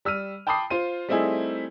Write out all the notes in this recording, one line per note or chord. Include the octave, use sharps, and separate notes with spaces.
G3 E6 F6 D#7
G5 A5 B5 D6 D#6 C7
F4 C5 D#7
G3 A3 C4 D#4 E4 G#4